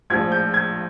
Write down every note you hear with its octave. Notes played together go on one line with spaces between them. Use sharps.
A#1 A2 F3 G#3 G#6
G6
G#6